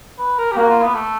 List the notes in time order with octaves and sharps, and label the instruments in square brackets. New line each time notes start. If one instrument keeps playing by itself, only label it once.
[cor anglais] B4
A#4
G4
[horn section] A#3 [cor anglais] F#4
[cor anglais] F4
B3
A3